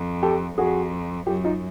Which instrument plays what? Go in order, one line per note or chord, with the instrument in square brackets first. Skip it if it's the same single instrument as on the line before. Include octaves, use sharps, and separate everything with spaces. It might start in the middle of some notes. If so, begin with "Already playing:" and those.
Already playing: [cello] F2
[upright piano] G4 A4
[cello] F2 [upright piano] F#4 G#4
[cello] F#2 [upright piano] F4 G4
[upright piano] D#4 F4